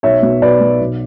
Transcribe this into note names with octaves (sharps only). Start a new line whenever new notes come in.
B1 C#5 E5
B2
B1 B4 D5
B2
B1